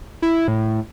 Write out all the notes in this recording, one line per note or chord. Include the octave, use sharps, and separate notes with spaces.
E4
A2